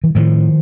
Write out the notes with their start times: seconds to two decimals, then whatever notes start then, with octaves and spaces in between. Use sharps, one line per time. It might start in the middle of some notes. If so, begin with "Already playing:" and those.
0.04 E3
0.15 A2 D#3 F3